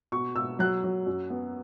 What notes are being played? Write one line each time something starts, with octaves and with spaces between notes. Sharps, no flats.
B2 C#6
B2 E6
F#3 F#6
F#3
F#2
B3